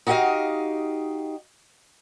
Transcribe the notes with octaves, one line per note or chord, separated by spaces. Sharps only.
D#4 F#4 G4 C#5 D#5 F5